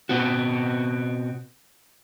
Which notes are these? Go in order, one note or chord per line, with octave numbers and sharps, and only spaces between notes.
B2 B3 C4 F#4